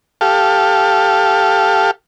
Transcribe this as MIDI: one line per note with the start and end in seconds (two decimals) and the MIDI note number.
0.21 1.91 67
0.21 1.91 69
0.21 1.91 77